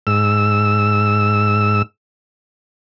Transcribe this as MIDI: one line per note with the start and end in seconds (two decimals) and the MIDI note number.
0.07 1.82 44
0.07 1.82 88